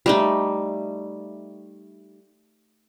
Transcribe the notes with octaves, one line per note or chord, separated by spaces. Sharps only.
G3 A3 D#4